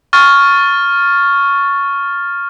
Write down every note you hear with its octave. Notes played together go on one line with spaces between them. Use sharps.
C#6 F6 A6